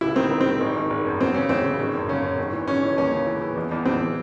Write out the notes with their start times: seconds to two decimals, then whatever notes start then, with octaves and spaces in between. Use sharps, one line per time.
0.01 C#2 E4
0.16 D#3 C4
0.31 D#3
0.41 C4
0.46 D#3
0.60 G#1
0.76 G#1
0.90 G#1
1.06 F#2
1.20 E2 C4
1.34 C#3 C#4
1.49 E2 C4
1.65 C#3
1.79 G#1
1.94 F#2
2.08 C#3 C#4
2.23 F#2
2.38 G#1
2.52 E3
2.67 G#1 C#4
2.83 E3
2.97 D#2 C#4
3.12 C#3
3.27 E3
3.41 E3
3.57 E2
3.72 E2
3.86 E2 C4
4.01 E3